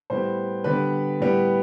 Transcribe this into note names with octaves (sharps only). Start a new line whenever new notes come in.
A2 G3 B3 C5
D3 G3 B3 B4
A2 G3 B3